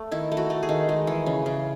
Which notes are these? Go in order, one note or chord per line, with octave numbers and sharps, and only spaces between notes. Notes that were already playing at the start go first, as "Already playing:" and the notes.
Already playing: A3
D#3 E4
A3
F#4
A3
G#4
D#3
G#3
E3
C#3
C#3